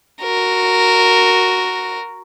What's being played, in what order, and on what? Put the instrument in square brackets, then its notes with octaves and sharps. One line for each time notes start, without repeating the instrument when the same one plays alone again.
[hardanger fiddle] F#4 A#4